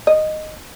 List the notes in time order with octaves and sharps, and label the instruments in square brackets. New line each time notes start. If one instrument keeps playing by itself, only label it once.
[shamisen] D#5